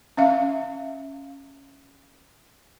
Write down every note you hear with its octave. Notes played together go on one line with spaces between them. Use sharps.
C#4 E5 F5